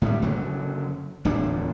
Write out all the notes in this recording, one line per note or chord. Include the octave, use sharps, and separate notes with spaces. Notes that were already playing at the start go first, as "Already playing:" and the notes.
A2 D3 F#3 G3
F#1 F#2 D3 F#3
D1 E2 A#2 D4